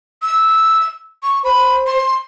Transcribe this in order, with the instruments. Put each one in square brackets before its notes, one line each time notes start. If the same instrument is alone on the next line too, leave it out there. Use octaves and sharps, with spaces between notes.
[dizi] E6
C#6
[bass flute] C5 [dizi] B5
[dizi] C6